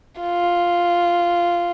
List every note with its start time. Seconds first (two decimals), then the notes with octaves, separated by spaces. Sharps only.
0.21 F4